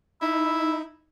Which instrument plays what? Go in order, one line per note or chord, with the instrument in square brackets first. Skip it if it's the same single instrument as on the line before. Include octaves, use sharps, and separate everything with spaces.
[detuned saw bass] D#4 [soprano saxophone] E4 [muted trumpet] B5 [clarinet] E6